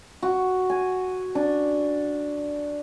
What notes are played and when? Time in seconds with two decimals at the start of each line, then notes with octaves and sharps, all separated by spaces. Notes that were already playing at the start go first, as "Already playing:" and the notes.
0.22 F#4
0.70 G#5
1.35 D4